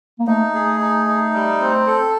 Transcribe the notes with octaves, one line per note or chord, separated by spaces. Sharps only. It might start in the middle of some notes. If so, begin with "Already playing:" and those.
A#3
A3 D#4
G#4
D#4
D#4
G3
C4
A4